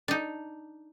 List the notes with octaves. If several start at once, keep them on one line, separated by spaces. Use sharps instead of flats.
D4 D#4